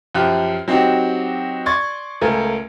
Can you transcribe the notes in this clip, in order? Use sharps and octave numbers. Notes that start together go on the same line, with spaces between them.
F#2 F3 G4 F#6
F#3 C4 D#4 F#4 G4
D5 C6 C#6 G#6 A6
C#2 A3 A#4 G#5